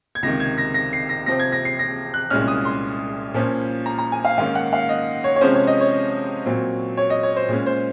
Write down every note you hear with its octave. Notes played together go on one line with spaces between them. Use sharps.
G#6
C#2 C3 D#3 A#6
G#6
A#6
A#6
C7
A#6
C3 F3 C4 A#6
G#6
A#6
C7
A#6
F#6
C2 A#2 G#3 C#4 F6
D#6
C6
A#2 F3 A#3 C#4
A#5
A#5
G#5
F5
G#2 D#3 A#3 C#4 F5
F#5
F5
D#5
C#5
C#5
C3 F3 G#3 C#4 C5
C#5
D#5
C#5
A#2 F#3 C4
C#5
D#5
C#5
C5
A#2 G#3 C#4
C5